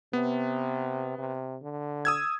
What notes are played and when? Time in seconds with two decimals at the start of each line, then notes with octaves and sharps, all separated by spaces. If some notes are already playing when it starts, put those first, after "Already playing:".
0.13 C3 B3
1.18 C3
1.62 D3
2.05 D#6 E6 G#6